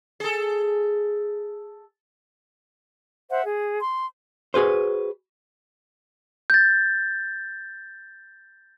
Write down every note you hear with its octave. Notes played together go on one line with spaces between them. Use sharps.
G#4 A4
C5 E5 F#5
G#4
C6
F#4 G#4 B4 C5
G6 A6